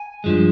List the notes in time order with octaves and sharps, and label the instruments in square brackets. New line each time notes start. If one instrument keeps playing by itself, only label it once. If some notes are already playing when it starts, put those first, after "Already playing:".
Already playing: [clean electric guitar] G#5
G2 F3 G#3